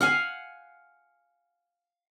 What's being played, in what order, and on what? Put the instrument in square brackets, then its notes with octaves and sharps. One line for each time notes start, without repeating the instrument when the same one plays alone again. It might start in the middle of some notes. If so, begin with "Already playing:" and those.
[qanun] F5 F#5 G#5